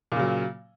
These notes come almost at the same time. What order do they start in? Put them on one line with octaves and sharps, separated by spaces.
A#2 C#3 F#3